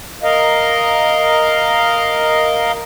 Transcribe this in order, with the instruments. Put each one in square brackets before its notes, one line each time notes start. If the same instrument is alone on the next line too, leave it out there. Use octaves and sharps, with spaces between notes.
[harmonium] A#4 D#5 F5